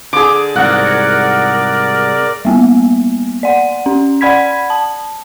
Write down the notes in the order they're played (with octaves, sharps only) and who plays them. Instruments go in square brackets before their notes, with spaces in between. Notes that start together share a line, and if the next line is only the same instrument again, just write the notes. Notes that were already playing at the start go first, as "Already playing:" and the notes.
[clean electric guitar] D3 [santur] G#4 D6
[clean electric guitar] C2 G#2 F#4 [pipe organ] A#4 D5 [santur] F#5
[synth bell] G3 A#3 B3
D5 F#5
C#4
D5 F#5 B5 G#6 B6
A5